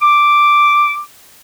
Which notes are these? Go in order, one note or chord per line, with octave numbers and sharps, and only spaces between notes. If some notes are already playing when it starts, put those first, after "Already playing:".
D6